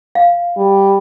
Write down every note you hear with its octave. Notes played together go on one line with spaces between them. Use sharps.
F5
G3